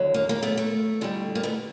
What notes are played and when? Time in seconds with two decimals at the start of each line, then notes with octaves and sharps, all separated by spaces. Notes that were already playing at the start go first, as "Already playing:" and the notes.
Already playing: D#2 D3 F#3
0.14 A#3
0.29 A#3
0.43 A3 B3
0.58 A3
1.01 F2 D3 G3
1.35 A#3
1.43 A3 B3